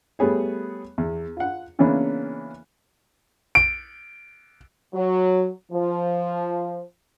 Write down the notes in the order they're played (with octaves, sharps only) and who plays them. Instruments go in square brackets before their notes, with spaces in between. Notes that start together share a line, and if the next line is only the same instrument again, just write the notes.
[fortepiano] G3 A3 B3 G#4 C#5
E2
F4 F#5
C#3 E3 A#3 B3 C#4 D4
[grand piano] D7
[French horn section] F#3
F3